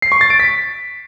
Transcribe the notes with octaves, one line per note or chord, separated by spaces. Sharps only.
C7
C#6
A6
D7
B6